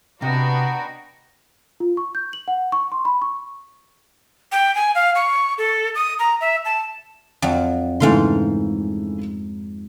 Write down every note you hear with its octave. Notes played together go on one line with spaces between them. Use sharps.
C3 B3 D4 F#4 D#5 G5 A#5
F4
C#6
G6
F#7
F#5
C#6
C6
B5
C#6
G5
G#5
F5
C#6
A4
D#6
A#5
E5
A5
F2 F#3
G#2 C#3 E3 A3 F5 C6